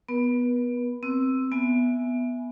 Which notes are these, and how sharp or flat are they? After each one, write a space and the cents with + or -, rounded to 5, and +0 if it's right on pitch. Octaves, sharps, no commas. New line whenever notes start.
B3 +0 B4 -40
C4 +0 E6 +0
B3 +0 E5 +0 G#5 +10